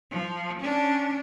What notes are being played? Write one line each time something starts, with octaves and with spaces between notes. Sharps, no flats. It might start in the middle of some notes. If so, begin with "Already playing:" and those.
F3
C#4 D4